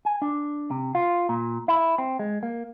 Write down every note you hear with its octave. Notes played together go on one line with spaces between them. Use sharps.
G#5
D4
C3
F4
A#2
E4
C4
G#3
A#3